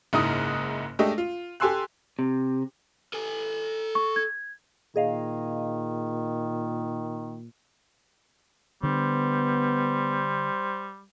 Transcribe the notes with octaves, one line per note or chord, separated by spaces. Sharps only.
F#1 G#2 D#4 E4 D#6 F6
G#3 A3 D4 G4 A4 D#5
F4
G4 A4 G#5 C6 E6 F#6
C3
A4 G#5
C#6
G#6
A#2 D#3 G#4 D#5 F5
D3 G3 B3 D4 C5